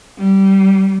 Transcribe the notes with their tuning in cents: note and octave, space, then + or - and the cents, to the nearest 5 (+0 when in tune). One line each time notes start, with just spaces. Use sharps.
G3 -20